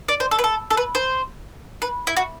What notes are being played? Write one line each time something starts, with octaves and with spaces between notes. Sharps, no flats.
D5
C5
A4
B4
A4
A4
B4
C5
B4
E4
F#4